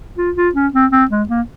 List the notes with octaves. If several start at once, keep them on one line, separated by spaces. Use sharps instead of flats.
F4
F4
C#4
C4
C4
G#3
A#3